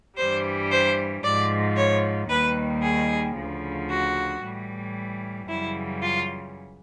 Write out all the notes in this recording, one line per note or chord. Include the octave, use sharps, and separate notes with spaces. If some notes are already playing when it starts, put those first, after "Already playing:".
G2 E3 G3 C5
C5
G#2 F3 D5
C#5
D#2 D#3 G3 B4
G#4
D2 C#3 F3
F#4
A2 E3 G3
F#2 C#3 E3 G3 E4
F4